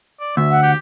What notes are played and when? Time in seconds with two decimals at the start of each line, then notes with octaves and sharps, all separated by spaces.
0.20 D5
0.37 D2 E5
0.51 F#5
0.63 G4